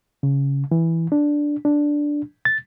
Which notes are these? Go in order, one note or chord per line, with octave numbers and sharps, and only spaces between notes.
C#3
E3
D4
D4
A6